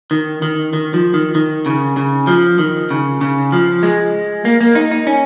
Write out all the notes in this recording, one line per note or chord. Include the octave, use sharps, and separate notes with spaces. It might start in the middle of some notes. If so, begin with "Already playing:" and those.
D#3
D#3
D#3
F3
D#3
D#3
C#3
C#3
F3
D#3
C#3
C#3
F3
G#3
A#3
A#3
D#4
D#4
C#4